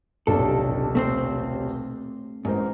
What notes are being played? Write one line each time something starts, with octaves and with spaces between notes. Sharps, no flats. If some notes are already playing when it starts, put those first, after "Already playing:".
D#1 B1 C3 D4 A4
A3 C4 C5
A1 G#2 A#4 C5